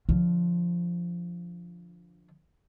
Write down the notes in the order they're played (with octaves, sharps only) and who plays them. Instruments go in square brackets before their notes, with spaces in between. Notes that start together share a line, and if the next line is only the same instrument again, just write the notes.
[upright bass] D3 F3